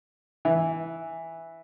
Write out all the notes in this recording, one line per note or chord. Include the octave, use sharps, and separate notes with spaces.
E3